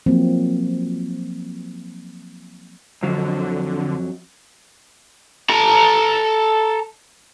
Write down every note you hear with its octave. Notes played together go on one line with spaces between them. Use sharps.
F3 F#3 A#3 C4
F2 D3 F#3
A4 A#5